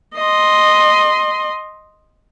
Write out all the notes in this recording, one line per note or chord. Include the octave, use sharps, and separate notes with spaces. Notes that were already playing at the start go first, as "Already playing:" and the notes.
D#5 C6